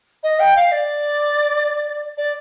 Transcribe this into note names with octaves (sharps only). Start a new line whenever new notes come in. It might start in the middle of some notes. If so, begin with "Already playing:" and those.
D#5
G5
F5
D5
D5